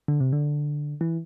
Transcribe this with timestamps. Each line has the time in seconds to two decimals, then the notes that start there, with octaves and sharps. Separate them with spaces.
0.08 D3
0.20 C3
0.33 D3
1.01 E3